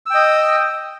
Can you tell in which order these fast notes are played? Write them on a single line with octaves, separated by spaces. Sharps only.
E6 G5 D#5